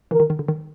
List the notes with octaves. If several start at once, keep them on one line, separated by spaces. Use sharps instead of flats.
D3 E3 A#4
D#3
D#3
D3
D#3